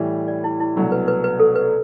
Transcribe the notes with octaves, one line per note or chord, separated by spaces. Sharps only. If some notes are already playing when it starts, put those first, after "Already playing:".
Already playing: A2 E3 G3
D5
E4
E4
C2 B2 F#3 A3 D4
B4
B4
B4
A4
B4